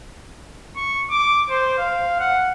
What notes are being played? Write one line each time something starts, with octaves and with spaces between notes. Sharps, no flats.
C#6
D6
C5
F5
F#5